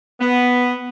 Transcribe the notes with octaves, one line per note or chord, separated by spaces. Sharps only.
B3